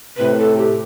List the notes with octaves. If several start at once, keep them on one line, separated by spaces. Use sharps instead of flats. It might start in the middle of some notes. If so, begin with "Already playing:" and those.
A2 C3 B4
A4
G4